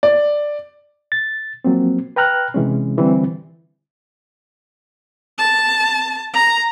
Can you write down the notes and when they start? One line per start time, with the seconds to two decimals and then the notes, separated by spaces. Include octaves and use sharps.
0.03 D5
1.12 A6
1.64 F3 F#3 A#3 C4
2.16 B4 G5 A#5 F6 F#6
2.54 C3 E3 G#3 C#4
2.97 D3 E3 G3 C4
5.38 A5
6.34 A#5